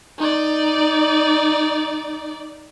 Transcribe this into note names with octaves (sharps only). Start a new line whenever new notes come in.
D#4 D5